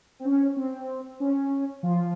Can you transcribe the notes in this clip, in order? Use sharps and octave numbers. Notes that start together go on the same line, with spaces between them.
C4
C#4
C4
C#4
F3 F4